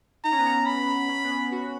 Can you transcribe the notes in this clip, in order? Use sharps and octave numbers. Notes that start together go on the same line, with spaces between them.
D#4 A#5
C#4
B3
C#4
B5
C#4
B3
C#4
F#4